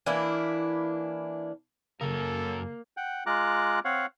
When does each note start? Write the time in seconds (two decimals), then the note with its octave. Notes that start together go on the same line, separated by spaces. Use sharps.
0.06 E3 A#3 D4 E4
2.01 F#2 C#3 F#3 A#3 A4 A#4
2.97 F#5 G5
3.26 G#3 F4 A#5 D6 F#6
3.85 C4 C#5 F5 F#5